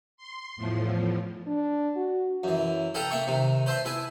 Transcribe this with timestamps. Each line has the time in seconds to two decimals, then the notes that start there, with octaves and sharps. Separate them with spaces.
0.17 C6
0.56 E2 A2 F3
1.47 D4
1.96 F#4
2.43 F#2 E3
2.94 A4 B4 F5 G5 A5 A#5
3.11 A#3 E5 G5 C#6
3.27 C3 D#3
3.66 B4 C5 E5 A5 C6
3.85 E4 B4 G#5 A5